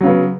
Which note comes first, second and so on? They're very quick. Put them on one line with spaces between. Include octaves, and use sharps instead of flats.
F#3 C#3 B3